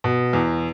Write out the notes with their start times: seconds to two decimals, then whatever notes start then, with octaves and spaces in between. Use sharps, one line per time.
0.04 B2
0.33 E2